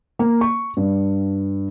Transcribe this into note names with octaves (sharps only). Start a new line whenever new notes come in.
A#3
C#6
G2